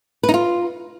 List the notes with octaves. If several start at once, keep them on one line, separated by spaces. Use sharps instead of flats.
B4
D#4
F4